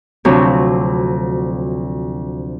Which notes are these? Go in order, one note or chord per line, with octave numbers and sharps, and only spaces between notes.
D2 C3 F3 F#3 C4 C#5